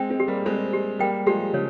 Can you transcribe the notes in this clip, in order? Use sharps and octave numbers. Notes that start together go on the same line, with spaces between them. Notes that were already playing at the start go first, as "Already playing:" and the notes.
Already playing: G#3 C4 G5
G#3 C4
G4
G3 A#3
G#3 C4 C5
G4
G3 A#3 G5
F3 G#3 G4
C#3 F3 C#5